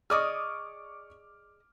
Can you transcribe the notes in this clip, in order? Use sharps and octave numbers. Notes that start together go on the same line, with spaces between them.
G#4 D5 D#5 C#6 D6 F6